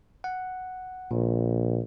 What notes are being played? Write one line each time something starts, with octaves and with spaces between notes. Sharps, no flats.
F#5
A#1 A#2